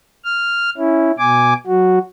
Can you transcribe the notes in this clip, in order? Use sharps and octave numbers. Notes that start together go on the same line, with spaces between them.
F6
C#4 E4
B2 G#5 D6
F#3 F#4